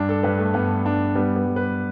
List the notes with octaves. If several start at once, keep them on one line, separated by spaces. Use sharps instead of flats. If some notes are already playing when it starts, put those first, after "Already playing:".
Already playing: G2 D4
A4
G2 B4
A3
G2 B3
G2 D4
G3 B3
B3
G3
B4